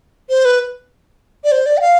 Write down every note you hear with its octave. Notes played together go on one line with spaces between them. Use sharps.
C5
B4
D5
C5
D5
G5
F5